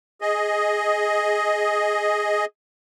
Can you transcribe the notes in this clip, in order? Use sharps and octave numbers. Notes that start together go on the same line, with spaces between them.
G#4 D#5